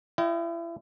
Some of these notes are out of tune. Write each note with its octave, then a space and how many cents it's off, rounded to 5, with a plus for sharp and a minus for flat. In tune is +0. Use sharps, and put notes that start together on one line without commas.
E4 +35 D#5 +0 G5 -30